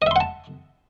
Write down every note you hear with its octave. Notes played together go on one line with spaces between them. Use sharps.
D#5 E5 F#5 A5 C6